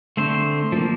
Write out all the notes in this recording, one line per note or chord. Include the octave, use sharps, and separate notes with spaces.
D3 A3 C4 C5
F3 A#3